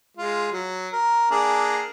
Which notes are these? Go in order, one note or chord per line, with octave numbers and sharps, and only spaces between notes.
G#3 F4
F#3
A#4
A#3 D4 G#4